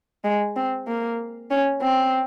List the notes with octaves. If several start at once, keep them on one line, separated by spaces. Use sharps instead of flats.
G#3
C4
A#3
C#4
C4